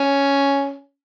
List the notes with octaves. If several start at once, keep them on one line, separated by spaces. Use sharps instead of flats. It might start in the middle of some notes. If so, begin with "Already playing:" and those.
Already playing: C#4